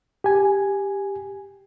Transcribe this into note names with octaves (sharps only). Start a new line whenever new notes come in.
G4 G#5